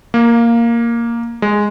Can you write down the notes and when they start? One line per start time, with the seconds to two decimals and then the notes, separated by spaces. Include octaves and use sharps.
0.14 A#3
1.42 G#3